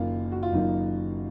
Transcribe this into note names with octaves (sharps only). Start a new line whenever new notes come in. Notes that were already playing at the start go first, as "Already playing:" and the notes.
Already playing: F#1 F#2 D#3 A#3 F4
F#4
F4
F#1 F#2 D#3 A#3 D#4